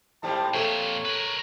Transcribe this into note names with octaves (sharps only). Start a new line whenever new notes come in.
G#2 G3 C4 A5
F2 A#2 A3 A4 C#5
A#4 B4